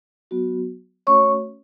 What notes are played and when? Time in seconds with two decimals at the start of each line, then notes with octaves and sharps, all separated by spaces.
0.31 F#3 B3 F#4
1.07 A3 C#4 F#4 C#5 C#6